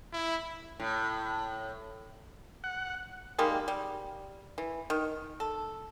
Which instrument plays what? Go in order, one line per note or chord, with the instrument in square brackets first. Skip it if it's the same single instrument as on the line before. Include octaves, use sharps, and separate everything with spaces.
[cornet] E4
[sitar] A2
[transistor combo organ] F#5
[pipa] D#3 G3 G#3 A#3
G3
E3
D#3
A4